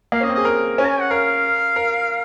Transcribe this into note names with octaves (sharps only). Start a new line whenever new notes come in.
A#3 F5
C#4 D#5
C4
G#4 D#5
A#4
C#4 G#5
A#5
G#5
F#5
A#4 F5
A#4